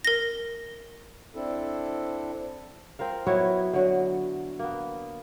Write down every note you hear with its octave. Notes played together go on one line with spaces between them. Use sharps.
A#4 A#6
C4 D4 E4 A4
C4 F4 A#4 F5
F#3 B3 E4 C#5
D3 F#3 F#4
A#3 B3